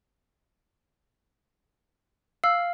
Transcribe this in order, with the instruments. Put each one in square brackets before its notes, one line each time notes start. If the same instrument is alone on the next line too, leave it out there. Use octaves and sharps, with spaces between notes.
[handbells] F5 [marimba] E6